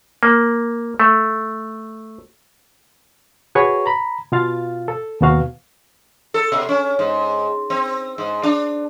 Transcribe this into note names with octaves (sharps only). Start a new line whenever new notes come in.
A#3
A3
F#4 G#4 B4 C#5 C#6
A#5 B5
B2 F4 F5 A6
A4
D#2 B2 B3 F#4 F5
A4
B2
C#4
G#2
C4
G#2
D4